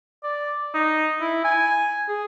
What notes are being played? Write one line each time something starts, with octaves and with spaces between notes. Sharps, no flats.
D5
D#4
E4
G#5
G#4